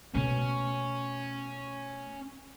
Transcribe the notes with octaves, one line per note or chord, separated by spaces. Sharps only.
B2 A3 C#4